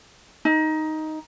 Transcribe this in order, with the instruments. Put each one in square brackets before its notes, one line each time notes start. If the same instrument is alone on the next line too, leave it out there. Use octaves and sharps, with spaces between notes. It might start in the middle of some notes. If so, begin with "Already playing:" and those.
[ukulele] D#4